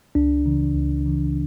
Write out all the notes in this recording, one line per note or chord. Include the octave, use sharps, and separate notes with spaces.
C#2 D4
C#3 E3
C#2
C#3 E3